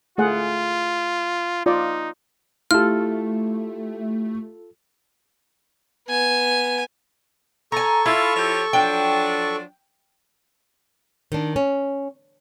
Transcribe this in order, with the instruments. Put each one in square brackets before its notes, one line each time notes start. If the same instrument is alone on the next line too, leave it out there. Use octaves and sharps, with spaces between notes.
[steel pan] A3 G#4 F#5 [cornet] F4
[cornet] D#4 [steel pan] F4 D5
[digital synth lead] A3 [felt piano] E4 G4 [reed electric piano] F4 A4 [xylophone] F6
[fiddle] B3 G#5
[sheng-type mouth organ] A4 C#6 [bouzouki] G#5 A#5
[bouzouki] E4 [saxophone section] F4 E5 F5
[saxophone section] F3 G4 C#5
[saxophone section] F3 F#3 D4 [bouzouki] G5
[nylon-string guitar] D#3 D4
C#4